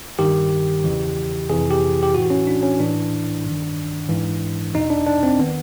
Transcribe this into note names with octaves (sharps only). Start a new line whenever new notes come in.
G2 D#3 G4
E2 C#3 E3
F2 C3 E3 G#4
G4
G4
A2 E3 F#4
C#4
D4
C#4
A2 E3 D4
G2 D#3
G#2 E3
E2 B2 D#4
D4
D4
C4
D#3 B3